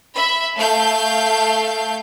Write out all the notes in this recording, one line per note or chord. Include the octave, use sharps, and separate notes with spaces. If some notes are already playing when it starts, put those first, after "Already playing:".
E5 B5
A3 F5 G6